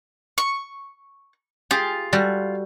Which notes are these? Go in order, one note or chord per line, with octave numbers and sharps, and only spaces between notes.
C#6
F4 G4 G#4
G3 F#4 A4